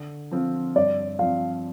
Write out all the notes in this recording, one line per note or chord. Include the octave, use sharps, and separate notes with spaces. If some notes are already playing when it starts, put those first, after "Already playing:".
Already playing: D3
F3 C4 F4
G2 D5
F3 C4 F5